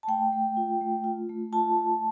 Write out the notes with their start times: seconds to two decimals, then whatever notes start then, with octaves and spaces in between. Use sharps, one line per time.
0.03 A5
0.08 A3 G5
0.32 A3
0.57 F4
0.81 A3
1.04 F4
1.29 A3
1.53 F4 A5
1.77 A3